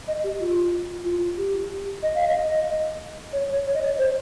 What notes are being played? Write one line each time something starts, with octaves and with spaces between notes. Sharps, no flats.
D#5
G4
F4
F4
G4
D#5
F5
D#5
C#5
C#5
C#5
D#5
C#5
C5